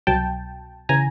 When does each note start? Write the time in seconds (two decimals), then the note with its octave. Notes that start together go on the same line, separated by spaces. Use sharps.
0.07 C2 B2 F#3 G5 A5
0.89 C#3 E3 G#5 A#5